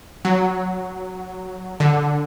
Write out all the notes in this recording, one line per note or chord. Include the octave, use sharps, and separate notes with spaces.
F#3
D3